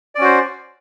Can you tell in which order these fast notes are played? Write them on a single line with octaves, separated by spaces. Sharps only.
D5 C#4 F#4 C5